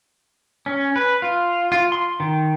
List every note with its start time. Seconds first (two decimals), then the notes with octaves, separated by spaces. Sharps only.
0.66 C#4
0.96 B4
1.22 F4
1.72 F4
1.92 C6
2.20 D#3